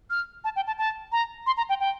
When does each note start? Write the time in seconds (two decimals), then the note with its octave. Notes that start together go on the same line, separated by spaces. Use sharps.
0.10 F6
0.44 A5
0.56 G5
0.67 A5
0.78 A5
1.12 A#5
1.46 C6
1.57 A#5
1.69 G5
1.80 G5